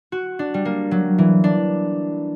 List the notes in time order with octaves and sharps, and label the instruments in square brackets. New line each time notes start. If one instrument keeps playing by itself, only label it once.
[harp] F#4
D4
G3
A#3
F#3
E3
D4